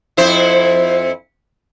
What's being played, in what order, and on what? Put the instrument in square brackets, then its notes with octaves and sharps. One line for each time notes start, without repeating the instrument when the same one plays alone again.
[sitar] F2 E4 C5